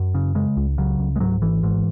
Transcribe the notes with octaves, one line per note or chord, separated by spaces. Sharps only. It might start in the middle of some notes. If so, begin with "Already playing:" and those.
Already playing: F#2
C#3
C#3 G#3
C#2
C#3 F#3
C#2
G#3
G#2 F#3
G#1 E3
G#2